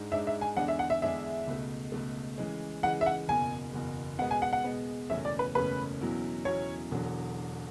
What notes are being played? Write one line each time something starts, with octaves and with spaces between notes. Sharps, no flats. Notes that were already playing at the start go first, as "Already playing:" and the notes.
Already playing: G#2 G#3 D4
G#2 G#3 D4 E5
E5
G#5
E2 D3 G#3 D4 G#4 F#5
E5
F#5
E5
E2 D3 G#3 D4 G#4 E5
C#2 B2 A3
C#2 B2 A3
C#3 E3 G#3
C#3 E3 G#3 F#5
E5
F#5
F#1 E2 B2 G#5
F#1 E2 B2
B2 G#3 B3 F#5
G#5
F#5
F#5
B2 G#3 B3
F#1 E2 B2 A3 C#4 E5
D5
B4
F#1 E2 B2 A3 C#4 B4
E2 B2 F#3 C#4 E4
E2 B2 F#3 C#4 E4 C#5
E1 E2 D3 F#3